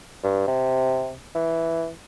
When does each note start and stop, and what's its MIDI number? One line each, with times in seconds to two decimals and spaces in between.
0.24 0.47 43
0.48 1.14 48
1.35 1.90 52